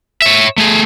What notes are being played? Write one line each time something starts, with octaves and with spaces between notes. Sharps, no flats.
C#5 E5
A3 G#4